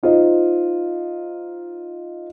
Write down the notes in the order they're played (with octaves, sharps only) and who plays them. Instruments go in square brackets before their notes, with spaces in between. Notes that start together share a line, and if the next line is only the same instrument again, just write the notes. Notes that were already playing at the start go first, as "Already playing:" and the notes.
[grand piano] D#4 F4 C5 D#5